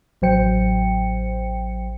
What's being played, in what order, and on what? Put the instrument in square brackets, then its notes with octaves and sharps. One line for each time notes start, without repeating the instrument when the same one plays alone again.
[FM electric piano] A1 F#3 C5 G5 C#7